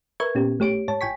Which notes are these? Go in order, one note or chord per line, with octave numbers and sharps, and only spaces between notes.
A#4 B4 E5 C#6 G#6
A#2 B3 C#4 G4
A1 A3 G4 C#5 D7
G#2 C#5 A5
G#1 G5 G#5 C#6 B6